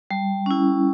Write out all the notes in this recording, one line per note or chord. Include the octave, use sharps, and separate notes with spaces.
G3
C#4 E4